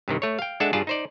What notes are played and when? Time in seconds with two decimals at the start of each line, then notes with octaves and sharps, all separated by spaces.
0.08 G2 C3 D#3
0.22 A3 C#5
0.39 F5 G5
0.60 G#3 D4 A4 E5 F#5 A5
0.73 G2 F4 G#4 D5 A5
0.87 D#4 C5 D5